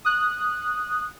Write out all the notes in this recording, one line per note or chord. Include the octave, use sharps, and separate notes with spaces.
D#6 F#6